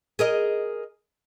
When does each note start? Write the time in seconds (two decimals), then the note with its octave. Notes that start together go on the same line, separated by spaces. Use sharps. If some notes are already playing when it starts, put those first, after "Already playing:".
0.19 G#4 A#4 D#5